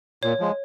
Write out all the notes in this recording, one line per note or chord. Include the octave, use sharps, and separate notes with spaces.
A#2 C#5
F3 G#3